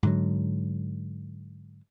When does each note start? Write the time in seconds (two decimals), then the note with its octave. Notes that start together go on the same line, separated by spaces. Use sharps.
0.03 G#2 D3 F#3